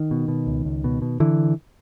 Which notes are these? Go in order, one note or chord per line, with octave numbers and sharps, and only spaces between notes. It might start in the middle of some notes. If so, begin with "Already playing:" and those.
Already playing: D#3
B2
B2
C#2
C#2
B2
B2
D3 E3